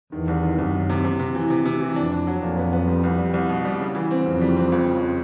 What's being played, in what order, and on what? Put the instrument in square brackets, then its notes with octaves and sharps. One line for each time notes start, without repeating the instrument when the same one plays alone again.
[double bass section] E2 [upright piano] D#3
[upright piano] C2
D#3
[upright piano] C2 [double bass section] F#2
[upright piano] D#3
C3
C3
C3
E3
C3
C3
E3
[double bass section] F2 [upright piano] D4
[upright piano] D4
F#3
[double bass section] F2 [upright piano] A#2
[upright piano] B3
B3
G3
C2
G3
C2
B2
G3
C#3
E3
C4
[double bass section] F2 [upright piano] C#3
[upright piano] G3
C4
C#2
C#3
C#3